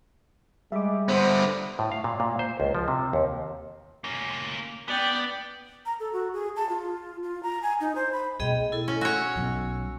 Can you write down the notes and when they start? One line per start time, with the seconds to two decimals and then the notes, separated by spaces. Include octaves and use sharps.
0.72 G3 G#3 E5 D6
1.09 D3 B3 C5
1.79 A2
1.92 F5
2.04 A#2
2.20 A#2
2.39 C5
2.60 C#2
2.75 F3
2.88 C3
3.13 D#2
4.04 A#3 C#4
4.88 B3 D5 G5
5.86 A#5
6.00 A4
6.13 F#4
6.33 G#4
6.56 A5
6.69 F4
7.23 F4
7.43 A#5
7.63 G#5
7.81 D#4
7.95 C5
8.12 B5
8.40 B2 A3 G#4 D#5 G5
8.72 E4 A4
8.88 C#4
9.01 F#4 C#5 E6
9.36 B1 F#3